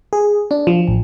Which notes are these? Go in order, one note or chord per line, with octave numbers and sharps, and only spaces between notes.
G#4
D4
F3
A1